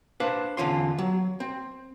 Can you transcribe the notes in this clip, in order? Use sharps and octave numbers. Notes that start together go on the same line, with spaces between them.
D4 B4 C5 F5
E2 D3 C#4 F4 C6
F#3
C4